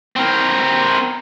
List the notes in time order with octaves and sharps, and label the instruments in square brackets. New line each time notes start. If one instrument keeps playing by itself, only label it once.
[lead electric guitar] C4 A#4